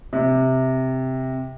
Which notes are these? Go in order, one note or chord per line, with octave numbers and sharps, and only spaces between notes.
C3